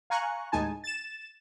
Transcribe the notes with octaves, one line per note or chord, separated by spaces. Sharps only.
F5 G#5 A#5 C#6 F#6
D#2 A2 G#3 D#4 G#5 A5
A6 E7